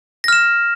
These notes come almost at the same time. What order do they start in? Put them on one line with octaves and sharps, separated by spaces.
A#6 F6 E7